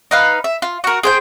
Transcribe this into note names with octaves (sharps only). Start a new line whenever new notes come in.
D#4 B4 F5
E5
F4
F#4 A#4
G#4 C5 G5